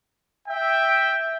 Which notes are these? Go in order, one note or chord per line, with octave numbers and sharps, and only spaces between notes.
E5 G5